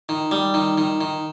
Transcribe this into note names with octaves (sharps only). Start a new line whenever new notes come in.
D#3
G3
D#3
D#3
D#3